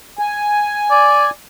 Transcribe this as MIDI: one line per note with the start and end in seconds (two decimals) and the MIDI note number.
0.19 1.30 80
0.91 1.27 74